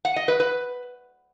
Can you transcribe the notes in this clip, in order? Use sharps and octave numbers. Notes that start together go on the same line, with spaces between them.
F#5
D#5
B4
B4